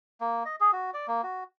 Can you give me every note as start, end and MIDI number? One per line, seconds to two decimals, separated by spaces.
0.21 0.43 58
0.45 0.56 75
0.60 0.71 68
0.72 0.91 66
0.94 1.06 74
1.08 1.22 58
1.23 1.44 66